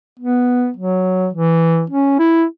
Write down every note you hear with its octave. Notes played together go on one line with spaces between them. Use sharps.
B3
F#3
E3
C#4
E4